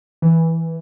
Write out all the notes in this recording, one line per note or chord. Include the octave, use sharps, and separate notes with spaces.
E3